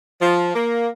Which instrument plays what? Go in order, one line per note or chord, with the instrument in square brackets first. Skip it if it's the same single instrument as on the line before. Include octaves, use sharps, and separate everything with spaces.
[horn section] F3
A#3